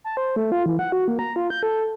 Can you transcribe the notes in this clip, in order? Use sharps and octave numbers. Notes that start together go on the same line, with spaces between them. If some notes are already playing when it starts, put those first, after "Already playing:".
A5
C5
A3
F4
E3
F#5
F#4
A#3
A#5
F4
G6
A4